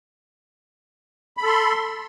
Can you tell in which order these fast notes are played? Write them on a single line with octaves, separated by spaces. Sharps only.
B5 A4 C6